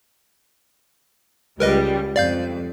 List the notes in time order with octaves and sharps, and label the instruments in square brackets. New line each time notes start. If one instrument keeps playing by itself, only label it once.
[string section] C#2 G3 [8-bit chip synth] A#4 B4 D#5
[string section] F2 [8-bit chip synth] D5 F5 G6